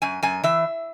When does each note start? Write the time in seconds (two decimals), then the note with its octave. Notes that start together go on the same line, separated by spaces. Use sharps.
0.02 F#2 G#5
0.23 F#2 G#5
0.43 E3 E5